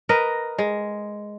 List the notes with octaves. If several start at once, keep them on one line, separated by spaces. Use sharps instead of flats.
A#4 B4 D#5
G#3